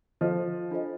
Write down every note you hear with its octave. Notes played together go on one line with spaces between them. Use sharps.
F3 A4 C5 D#5
D4 F4 A4 C5 D#5